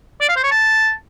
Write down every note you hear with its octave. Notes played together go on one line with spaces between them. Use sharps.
D5
F5
C5
C#5
A5